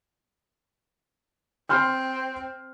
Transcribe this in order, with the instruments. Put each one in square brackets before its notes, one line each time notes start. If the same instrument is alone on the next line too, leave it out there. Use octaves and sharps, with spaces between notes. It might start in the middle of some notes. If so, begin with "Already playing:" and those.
[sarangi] C4 [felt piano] C6 F6 G6